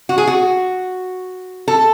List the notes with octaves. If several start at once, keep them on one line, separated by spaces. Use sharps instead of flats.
F#4
G#4
F#4
A4